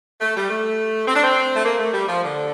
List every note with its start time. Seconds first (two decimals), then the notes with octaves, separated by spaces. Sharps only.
0.21 A3
0.37 G3
0.50 A3
1.08 C4
1.15 D4
1.24 C4
1.56 A3
1.65 A#3
1.79 A3
1.93 G3
2.08 F3
2.23 D3